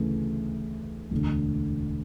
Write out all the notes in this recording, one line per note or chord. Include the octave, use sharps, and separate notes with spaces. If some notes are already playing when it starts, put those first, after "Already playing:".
Already playing: D2 C#3 E3 A3
E1 D2 D3